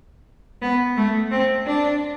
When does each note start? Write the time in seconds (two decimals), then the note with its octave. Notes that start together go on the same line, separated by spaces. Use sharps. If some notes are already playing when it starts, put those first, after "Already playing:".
0.62 B3
0.97 A3
1.31 C4
1.66 D4